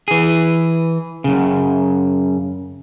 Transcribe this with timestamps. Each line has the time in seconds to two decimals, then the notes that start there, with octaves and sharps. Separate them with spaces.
0.08 E3 G#4
1.24 F#2 C#3